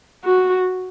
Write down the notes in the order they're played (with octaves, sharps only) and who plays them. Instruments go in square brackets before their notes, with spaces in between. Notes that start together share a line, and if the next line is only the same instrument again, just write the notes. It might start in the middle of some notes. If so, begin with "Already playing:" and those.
[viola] F#4